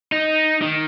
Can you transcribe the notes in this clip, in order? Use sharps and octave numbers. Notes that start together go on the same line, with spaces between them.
D#4
D#3